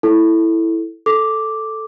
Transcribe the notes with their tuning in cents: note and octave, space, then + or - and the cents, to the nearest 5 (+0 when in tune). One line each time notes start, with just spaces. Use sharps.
E4 +0 A4 +0
A4 +0 D6 +0